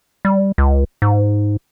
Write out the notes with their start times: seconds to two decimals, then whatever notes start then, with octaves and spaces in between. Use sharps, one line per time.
0.25 G3
0.58 C#2
1.02 G#2